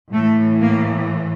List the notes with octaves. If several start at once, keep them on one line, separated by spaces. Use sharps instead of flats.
A2 E3 A3
A#3